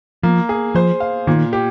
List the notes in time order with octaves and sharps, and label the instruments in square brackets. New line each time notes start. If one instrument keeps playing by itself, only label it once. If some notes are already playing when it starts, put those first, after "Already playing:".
[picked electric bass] F3 [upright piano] A#3
[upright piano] G#4
[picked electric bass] F3 [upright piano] C5
[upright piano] F5
[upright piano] A#2 [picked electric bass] D#3
[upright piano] G4